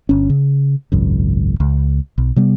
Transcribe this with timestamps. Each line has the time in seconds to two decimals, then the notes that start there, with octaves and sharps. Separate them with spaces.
0.09 G1 C#4
0.30 C#3
0.92 G#1 C#2 F#2
1.60 C#2
2.18 B1
2.36 C3 G3 B3